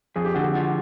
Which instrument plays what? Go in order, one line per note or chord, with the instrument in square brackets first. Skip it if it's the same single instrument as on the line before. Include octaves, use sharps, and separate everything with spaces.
[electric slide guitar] F2 [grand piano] G#4
[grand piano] G4
[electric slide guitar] D3 [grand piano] F#4
[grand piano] G4
[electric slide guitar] F3